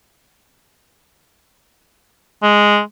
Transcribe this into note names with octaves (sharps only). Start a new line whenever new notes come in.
G#3